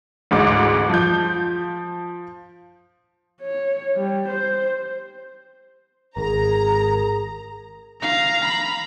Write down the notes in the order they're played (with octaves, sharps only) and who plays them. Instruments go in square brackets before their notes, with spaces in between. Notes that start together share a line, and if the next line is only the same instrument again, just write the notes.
[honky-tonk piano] A1 D2 G#2 D6
F3 G6
[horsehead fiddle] C#5
G3
C5
[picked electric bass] G#1 [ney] G#4 [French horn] A#4 [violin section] A#5
[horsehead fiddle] F5 [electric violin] A#5
[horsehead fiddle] B5